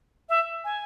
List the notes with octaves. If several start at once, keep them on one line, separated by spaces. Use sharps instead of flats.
E5
G#5